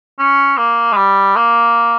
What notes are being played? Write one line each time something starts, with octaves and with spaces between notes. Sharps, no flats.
C#4
A#3
G#3
G3
A#3